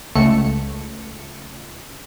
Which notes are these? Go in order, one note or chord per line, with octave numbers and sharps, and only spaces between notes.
C#2 A3 C#7